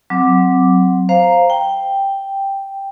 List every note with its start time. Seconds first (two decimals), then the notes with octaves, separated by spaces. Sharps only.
0.10 F#3 C4 D6
1.09 C5 F5 A#5
1.50 G5